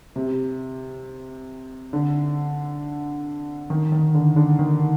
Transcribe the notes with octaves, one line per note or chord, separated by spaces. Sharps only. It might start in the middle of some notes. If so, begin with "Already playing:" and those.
C3
D3
D#3
D#3
D3
D3
D#3